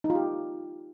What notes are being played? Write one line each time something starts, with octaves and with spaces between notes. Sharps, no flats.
D#4
F4
G4